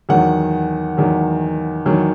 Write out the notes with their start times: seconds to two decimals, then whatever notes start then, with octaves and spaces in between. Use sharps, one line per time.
0.09 E2 D#3 F#3 F#5
0.97 E2 D#3 F#3
1.86 E2 D#3 F#3